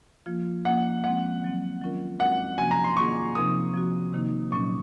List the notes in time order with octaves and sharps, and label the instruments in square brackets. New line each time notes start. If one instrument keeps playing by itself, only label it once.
[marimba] F3 A#3 F4
[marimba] F3 A#3 C#4 [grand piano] F#5
[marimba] F3 G#3 C4 [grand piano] F#5
[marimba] D#3 F#3 C4
D#3 F#3 C#4 F4 A#4
[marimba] G#3 C4 F#4 A#4 [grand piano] F#5
[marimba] C3 F3 A#3 C#4 F#4 [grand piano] G#5
[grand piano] A#5
C6
[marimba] D#3 A#3 F4 G#4 [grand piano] C#6
[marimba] C3 F3 C4 D#4 A#4 [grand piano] D#6
[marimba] F3 C4 F#4
C3 D#3 A#3 D#4
[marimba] A#2 F#3 C#4 [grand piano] C#6